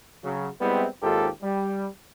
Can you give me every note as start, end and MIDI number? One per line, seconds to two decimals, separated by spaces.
0.24 0.49 49
0.24 0.49 54
0.61 0.87 55
0.61 0.87 56
0.61 0.87 59
0.61 0.87 60
0.61 0.87 64
1.03 1.29 32
1.03 1.29 39
1.03 1.29 44
1.03 1.29 65
1.03 1.29 67
1.03 1.29 69
1.43 1.86 55